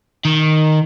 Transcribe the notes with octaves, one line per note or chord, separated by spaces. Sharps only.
D#3